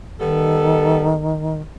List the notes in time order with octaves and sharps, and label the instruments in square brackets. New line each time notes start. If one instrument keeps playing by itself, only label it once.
[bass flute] D#3 [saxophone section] G3 B3 A4